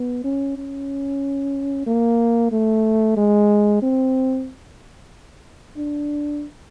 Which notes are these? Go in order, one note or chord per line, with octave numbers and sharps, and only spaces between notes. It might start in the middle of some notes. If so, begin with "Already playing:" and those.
Already playing: B3
C#4
C#4
A#3
A3
G#3
C4
D4